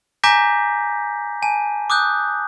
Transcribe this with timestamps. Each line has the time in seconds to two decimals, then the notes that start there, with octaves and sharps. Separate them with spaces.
0.24 G#5 A#5 D6 G6 A#6 B6
1.42 G#5 A5
1.90 D6 D#6 F#6 G6